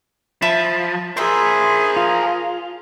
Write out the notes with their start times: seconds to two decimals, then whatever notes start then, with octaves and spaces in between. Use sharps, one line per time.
0.42 F3 E5 A5 B5
1.17 G#4 A#4 C5 E5 C6
1.96 F4